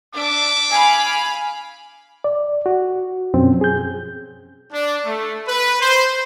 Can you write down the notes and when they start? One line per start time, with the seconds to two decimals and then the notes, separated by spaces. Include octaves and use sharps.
0.15 D4 E5 D6
0.71 F5 G#5 B5
2.24 D5
2.66 F#4
3.34 F#2 B2 F3 C4 C#4
3.61 G#4 G6
4.73 D4
5.05 A3
5.46 B4
5.81 C5